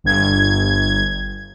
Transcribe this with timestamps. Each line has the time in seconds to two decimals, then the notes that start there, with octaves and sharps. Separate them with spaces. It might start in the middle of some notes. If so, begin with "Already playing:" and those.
0.04 G1 G#6